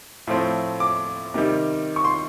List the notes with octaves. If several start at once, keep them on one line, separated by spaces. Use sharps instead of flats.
A2 F3 A3 C4
D6
C3 D#3 G3
C#6
C6